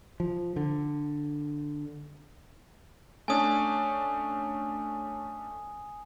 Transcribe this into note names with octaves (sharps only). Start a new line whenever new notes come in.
F3
D3
A3 C#4 D4 G#5 D#6